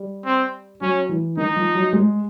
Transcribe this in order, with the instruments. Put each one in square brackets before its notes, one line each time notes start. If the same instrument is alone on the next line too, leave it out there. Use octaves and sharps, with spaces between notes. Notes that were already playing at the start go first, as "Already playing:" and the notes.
Already playing: [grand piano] G3
[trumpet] C4
[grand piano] F#3 [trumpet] C#4
[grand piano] E3
[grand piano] D#3 [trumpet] D#4
[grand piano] F3
F#3
G#3